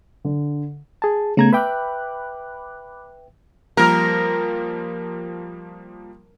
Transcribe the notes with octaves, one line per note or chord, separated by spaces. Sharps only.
D3
G#4 A5
C#3 A3 B3 A#5 G#6
B4 E5 G5 B5 D6 F#6
F3 G3 A#3 A#4